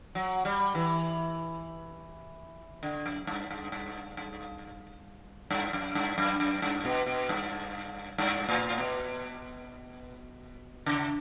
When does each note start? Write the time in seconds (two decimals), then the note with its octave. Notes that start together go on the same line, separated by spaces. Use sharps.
0.15 F#3
0.45 G3
0.75 E3
2.83 D3
3.06 F#2
3.27 G2
3.51 G2
3.72 G2
4.17 G2
5.51 G2
5.73 F#2
5.95 G2
6.18 F#2
6.40 F#2
6.62 G2
6.85 B2
7.06 B2
7.29 G2
8.18 G2
8.49 A2
8.78 B2
10.86 C#3